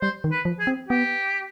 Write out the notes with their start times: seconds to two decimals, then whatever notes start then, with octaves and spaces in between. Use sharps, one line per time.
0.01 G3 C5
0.24 D#3
0.32 B4
0.45 F3
0.60 G#4
0.67 C4
0.89 B3 G4